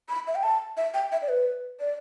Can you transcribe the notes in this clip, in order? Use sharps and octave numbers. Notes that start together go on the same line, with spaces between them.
B5
E5
G5
A5
E5
G5
E5
D5
B4
D5